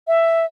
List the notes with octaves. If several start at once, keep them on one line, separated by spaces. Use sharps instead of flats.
E5